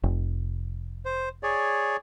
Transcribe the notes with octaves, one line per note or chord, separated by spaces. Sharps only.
F1
C5
G#4 C#5 D5